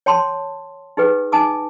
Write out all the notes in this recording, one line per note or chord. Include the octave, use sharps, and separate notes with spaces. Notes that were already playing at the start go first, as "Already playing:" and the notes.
C#5 G5 A5 C6
D#4 G4 G#4 B4 G5
D#4 G#5 A5 D6 D#6